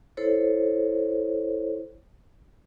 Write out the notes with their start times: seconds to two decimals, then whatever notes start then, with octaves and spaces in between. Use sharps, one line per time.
0.17 E4 A4 C5 C#5